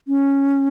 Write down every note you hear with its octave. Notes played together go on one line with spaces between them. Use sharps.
C#4